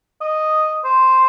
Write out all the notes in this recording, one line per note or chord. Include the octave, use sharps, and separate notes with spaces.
D#5
C5